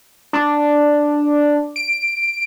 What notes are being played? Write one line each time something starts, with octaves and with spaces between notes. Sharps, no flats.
D4
D7